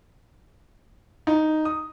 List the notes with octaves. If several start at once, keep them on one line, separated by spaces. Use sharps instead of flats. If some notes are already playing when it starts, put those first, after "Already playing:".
D#4
D#6